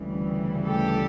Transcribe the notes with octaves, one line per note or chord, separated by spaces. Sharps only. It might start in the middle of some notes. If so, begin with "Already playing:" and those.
Already playing: D2 C#3 E3 G3
G4 A4